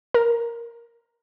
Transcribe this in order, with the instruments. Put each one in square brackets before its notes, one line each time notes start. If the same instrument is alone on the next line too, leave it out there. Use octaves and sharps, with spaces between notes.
[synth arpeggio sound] A#4